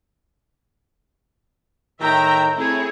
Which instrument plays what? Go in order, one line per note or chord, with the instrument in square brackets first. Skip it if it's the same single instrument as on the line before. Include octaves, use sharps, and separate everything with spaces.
[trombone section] A2 D#3 [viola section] E5 G5 A#5
[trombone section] A3 C4 [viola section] E4 G#4 C#5